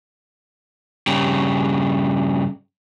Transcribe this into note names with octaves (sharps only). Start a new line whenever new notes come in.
G2 C#3